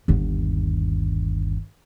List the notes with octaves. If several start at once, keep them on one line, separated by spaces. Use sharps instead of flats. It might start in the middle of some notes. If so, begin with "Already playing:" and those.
G1 D#2